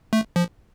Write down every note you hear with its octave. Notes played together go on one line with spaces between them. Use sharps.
A3
F3